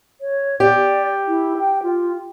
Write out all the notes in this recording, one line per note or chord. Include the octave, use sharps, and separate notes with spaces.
C#5
G4 D5
E4
G5
F4